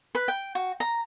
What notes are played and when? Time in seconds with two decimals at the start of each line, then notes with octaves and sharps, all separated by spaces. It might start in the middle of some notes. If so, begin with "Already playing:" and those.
0.15 B4
0.28 G5
0.55 F#4
0.80 A#5